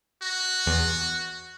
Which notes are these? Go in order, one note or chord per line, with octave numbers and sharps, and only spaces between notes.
F#4
E2